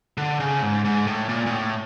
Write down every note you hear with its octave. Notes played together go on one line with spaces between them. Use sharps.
D3
C#3
G#2
G#2
A2
A#2
A#2
A2